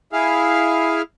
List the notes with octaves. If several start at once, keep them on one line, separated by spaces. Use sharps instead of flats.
E4 G#4 F5